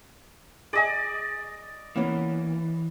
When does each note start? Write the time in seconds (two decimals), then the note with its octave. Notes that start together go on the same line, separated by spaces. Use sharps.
0.73 G#4 D5 D#5 G#5
1.96 E3 A#3 B3 C#4